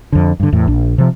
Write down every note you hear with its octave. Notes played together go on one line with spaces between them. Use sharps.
F2 D3
G2 D3
E2 A2
A#1 D4
C3 F3